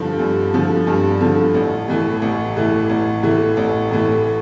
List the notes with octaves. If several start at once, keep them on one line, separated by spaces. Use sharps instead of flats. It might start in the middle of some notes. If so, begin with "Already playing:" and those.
Already playing: G2 D3 F3
G2
D3 F3
G2
D3 F3
A1
A2 E3 A3
A1
A2 E3 A3
A1
A2 E3 A3
A1
A2 E3 A3